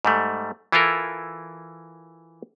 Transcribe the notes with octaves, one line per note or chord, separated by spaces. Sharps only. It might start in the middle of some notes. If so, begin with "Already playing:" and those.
G#2 G3 A3
E3 E4 F4 A4 A#4